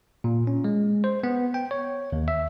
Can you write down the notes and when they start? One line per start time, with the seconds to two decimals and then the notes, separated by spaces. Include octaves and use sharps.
0.24 A#2
0.47 C#4
0.64 G#3
1.04 C5
1.24 B3
1.54 G5
1.71 C#5
2.12 D#2
2.28 E5